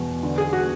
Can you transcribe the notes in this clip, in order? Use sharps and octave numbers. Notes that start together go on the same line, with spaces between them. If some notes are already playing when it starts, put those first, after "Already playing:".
Already playing: E2 B2
D3
G#4
F#4